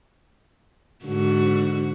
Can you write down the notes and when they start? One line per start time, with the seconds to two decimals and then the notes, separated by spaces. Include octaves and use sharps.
1.06 G#2 D3 F#4